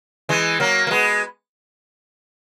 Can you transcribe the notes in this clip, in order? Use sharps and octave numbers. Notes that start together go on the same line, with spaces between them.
E3 G#3
F#3 A#3
A#3
G#3 B3